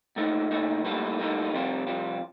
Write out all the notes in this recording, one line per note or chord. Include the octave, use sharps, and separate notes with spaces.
A#2 A3 D#4
A#2 A3 D#4
A2 G3 A#3 D#4 A4
A2 G3 A#3 D#4 A4
F2 C3 G3 C4 F4
F2 C3 G3 C4 F4